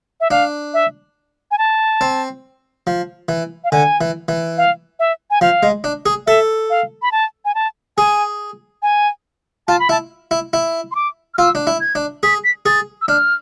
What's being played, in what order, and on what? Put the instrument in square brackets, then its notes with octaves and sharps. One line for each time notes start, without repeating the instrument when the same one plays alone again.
[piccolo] E5
[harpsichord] D4 [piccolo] F5
[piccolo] E5
G#5
A5
[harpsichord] C4
F3
E3
[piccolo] F5
[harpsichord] D3 [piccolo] G#5
[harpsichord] E3
E3
[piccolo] F5
E5
G#5
[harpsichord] F3 [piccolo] F5
[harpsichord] G#3
D4
G#4
[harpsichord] A4 [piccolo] E5
[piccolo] F5
B5
A5
G#5
A5
[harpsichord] G#4 [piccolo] G#5
[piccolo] G#5
[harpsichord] F4 [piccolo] A5
[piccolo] B5
[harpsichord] E4 [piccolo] A5
[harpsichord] E4
E4
[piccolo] C6
D6
F6
[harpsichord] F4 [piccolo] E6
[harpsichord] D4
E4
[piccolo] G#6
[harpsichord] D4
[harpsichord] G#4 [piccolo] B6
[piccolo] B6
[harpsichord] G#4 [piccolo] A6
[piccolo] E6
[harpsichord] D4 [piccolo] F6